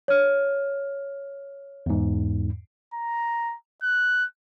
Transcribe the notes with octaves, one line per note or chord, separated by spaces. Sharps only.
C#5 F6
E2 G#2
A#5
F#6